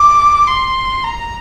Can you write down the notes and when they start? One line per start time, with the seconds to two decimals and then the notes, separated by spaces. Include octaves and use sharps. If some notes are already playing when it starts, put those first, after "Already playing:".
Already playing: D6
0.48 C6
1.04 A#5